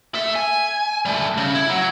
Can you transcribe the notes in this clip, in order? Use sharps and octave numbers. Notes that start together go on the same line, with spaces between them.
A4 E5
G#5
G3 A3
C#3
E4
F#3